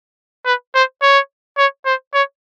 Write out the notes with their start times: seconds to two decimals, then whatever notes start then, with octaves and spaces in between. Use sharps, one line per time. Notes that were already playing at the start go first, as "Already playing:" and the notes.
0.46 B4
0.75 C5
1.02 C#5
1.58 C#5
1.86 C5
2.14 C#5